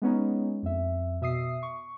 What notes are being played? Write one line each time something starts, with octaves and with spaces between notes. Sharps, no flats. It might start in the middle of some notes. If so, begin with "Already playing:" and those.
G#3 B3 C#4 D#4
F2 E5
B2 E5 D#6 C7
C#6